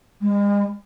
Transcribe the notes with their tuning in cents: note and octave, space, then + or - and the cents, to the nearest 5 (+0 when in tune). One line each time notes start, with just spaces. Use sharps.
G#3 -40